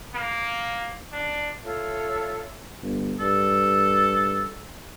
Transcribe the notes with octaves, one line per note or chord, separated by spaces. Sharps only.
A#3
D4
F4 A4 C#5 E5
G1
G2 A4